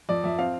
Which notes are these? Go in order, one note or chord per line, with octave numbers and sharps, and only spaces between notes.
F2 D5
F2 E5
C4 F5